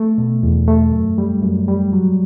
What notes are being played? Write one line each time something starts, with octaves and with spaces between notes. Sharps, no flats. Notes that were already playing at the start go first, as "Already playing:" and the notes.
Already playing: A3
B2
E2
A3
F#2
G3
F#2
G3
F#3